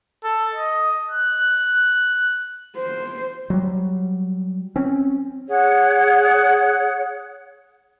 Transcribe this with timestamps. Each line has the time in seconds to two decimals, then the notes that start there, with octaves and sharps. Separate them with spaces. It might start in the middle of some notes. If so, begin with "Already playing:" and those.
0.24 A4
0.55 D#5
1.11 F#6
2.77 C5
3.50 F#3 G3
4.76 C4 C#4
5.48 G#4 C#5 F#5